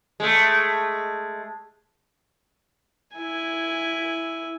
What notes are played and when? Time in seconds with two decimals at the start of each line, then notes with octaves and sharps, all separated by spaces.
0.20 G#3 A3
3.16 E4 G#5